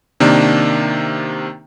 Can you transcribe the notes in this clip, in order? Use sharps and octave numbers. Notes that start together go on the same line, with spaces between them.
C3 D#3 A#3 D4